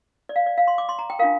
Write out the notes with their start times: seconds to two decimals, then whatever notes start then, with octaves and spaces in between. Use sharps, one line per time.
0.29 D5
0.36 F5
0.46 D5
0.58 F5
0.67 C6
0.78 D6
0.89 C6
0.99 A#5
1.10 G5
1.19 D4 F4 A#4 F5